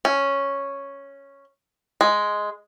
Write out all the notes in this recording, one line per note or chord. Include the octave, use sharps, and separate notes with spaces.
C#4
G#3